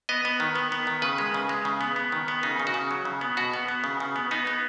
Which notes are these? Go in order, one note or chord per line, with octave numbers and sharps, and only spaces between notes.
B3 D#5
B3
D#3
B3
B3
D#3
C#3 B4
G#3
C#3
G#3
C#3
B3
B3
D#3
B3
C#3 D#4
C#3
F#4
C#3
F#3
C#3
B3
B2 F#4
B3
B3
C#3
C#3
B3
B3 D#4
B3